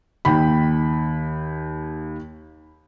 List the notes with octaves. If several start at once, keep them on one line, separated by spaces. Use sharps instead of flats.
D#2 G5 B5